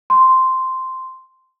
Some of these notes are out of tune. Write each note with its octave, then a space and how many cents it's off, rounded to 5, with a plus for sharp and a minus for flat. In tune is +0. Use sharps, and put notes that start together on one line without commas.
C6 -5